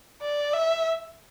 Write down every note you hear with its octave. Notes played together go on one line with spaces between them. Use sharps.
D5
E5